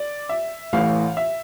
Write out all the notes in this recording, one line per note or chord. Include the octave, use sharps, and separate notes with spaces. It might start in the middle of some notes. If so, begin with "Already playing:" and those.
Already playing: D5
E5
A1 A2 E3 F5
E5